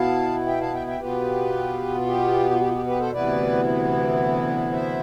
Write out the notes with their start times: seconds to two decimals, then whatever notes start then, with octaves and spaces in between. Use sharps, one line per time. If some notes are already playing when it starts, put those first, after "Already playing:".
Already playing: B2 B3 E4 F5 A5
0.47 E5 G5
0.61 F5 A5
0.74 E5 G5
0.87 E5 G5
1.00 B2 B3 F4 G4 B4
2.07 G4
2.51 F4
2.60 G4
2.67 F4
2.73 G4
2.86 G4 B4
2.99 A4 C5
3.13 D2 C3 E3 B3 E4 B4 D5
4.72 C5 E5